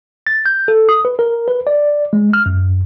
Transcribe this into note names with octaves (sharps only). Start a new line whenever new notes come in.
A6
G6
A4
D#6
B4
A#4
B4
D5
G#3
F6
F#2